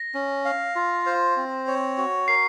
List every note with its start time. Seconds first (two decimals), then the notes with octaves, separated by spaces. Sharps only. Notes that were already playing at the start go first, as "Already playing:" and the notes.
Already playing: A#6
0.14 C#4
0.45 F5
0.76 F4
1.06 C5
1.37 C4
1.67 C#5
1.98 F#4
2.28 A#4 C7